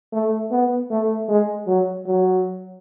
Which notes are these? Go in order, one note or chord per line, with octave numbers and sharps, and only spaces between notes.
A3
B3
A3
G#3
F#3
F#3